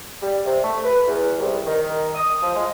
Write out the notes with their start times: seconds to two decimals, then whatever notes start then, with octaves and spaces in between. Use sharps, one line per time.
0.22 G3
0.46 C3
0.63 A3
0.84 B4
1.07 E2
1.38 C2
1.67 D#3
2.15 D#6
2.42 F3
2.55 G#3